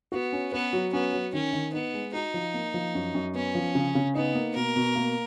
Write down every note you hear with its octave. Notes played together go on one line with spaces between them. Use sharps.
B3 F#4
C#4
B3 B4
F#3
B3 C#4
F#3
D#3 C#4
D#3
B3 D#4
G#3
D#4 F#4
F3
A#3
F3
F#2
F#2
B3 C#4
F3
C#3
C#3
B3 D#4
A#3
B2 A#4
B2
A#3